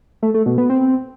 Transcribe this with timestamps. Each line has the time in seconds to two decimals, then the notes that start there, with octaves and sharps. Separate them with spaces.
0.22 A3
0.34 A3
0.46 B2
0.58 B3
0.70 C4